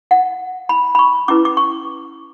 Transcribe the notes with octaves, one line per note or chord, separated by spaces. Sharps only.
F#5
B5
B5
C#6
C#4 E4 B4 D6
D6
C#6